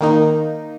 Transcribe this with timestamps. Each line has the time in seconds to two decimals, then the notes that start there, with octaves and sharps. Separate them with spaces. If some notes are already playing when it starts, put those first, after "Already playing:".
0.01 D#3 A#3 D#4